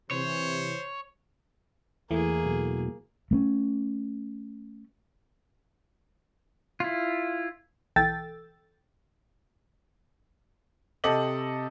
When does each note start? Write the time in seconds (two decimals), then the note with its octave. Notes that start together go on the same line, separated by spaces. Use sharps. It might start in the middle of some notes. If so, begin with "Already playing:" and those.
0.11 C3 E3 C5 C#5
2.11 E2 E3 A3 A#3 G#4
2.45 B2 F#3
3.31 A3 A#3 C#4
6.80 E4 F4
7.96 B1 E3 A4 G5 E6 A6
11.04 C3 G4 A4 D#5 D6 F#7